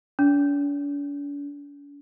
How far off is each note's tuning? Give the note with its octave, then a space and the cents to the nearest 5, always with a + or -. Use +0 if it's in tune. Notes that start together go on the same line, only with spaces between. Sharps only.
D4 -45